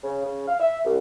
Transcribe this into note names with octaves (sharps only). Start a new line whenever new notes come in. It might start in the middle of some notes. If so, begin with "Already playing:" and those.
C#3
C#3
F5
E5
C2